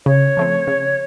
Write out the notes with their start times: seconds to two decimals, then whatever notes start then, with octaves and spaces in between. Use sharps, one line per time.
0.06 C#3 C#5
0.37 F3 A3 C4
0.67 C#3